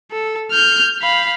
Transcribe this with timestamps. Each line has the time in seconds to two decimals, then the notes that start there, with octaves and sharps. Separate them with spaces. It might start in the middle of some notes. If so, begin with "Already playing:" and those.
0.11 A4
0.52 F6 G6
1.02 F5 B5